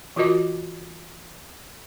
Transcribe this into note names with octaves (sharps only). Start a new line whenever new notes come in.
E3 F4 F#4 A#4 D#5 D6